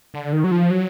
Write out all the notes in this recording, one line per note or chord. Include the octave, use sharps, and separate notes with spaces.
D3
D#3
F#3
F3
F#3